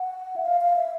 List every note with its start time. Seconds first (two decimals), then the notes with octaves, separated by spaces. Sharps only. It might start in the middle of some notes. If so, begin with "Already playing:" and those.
Already playing: F#5
0.36 E5
0.46 F5
0.61 F5
0.76 E5